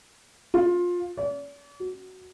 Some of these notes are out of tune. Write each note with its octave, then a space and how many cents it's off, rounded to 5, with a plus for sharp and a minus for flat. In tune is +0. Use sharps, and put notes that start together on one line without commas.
F4 +20
D5 -45
F#4 +10